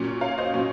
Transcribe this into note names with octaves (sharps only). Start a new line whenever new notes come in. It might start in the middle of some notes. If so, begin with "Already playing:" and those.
Already playing: A#2 F#3 C#4
C#5 F5
C5 D#5
A#2 F#3 C#4